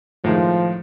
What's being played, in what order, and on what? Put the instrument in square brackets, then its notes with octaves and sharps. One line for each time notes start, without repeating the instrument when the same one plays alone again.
[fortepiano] A2 D#3 G#3 [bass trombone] F3